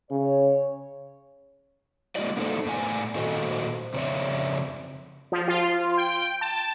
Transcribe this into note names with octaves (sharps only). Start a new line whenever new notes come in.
C#3 C#5
G#3 A#3 E4 F#4 D5 D#5
A#3 B3 D4 D#4 A4 C5
A2 B3 D5 G#5
A#2 D#3 F#4 A4 C5 D#5
F2 C#3 C4 C#5 D5 E5
F3
F4
G5
A5